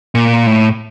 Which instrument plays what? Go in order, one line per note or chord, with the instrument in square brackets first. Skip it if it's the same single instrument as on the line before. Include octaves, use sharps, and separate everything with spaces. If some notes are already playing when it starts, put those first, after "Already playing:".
[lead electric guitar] A#2
A2